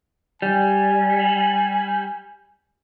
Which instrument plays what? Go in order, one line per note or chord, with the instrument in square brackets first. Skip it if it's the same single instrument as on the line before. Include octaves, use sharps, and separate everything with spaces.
[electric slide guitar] G3 [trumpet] G#5